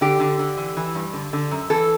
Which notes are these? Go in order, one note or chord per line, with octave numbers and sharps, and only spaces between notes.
D3 G4
D3
D3
E3
E3
G2
D3
D3
F#2
E3 A4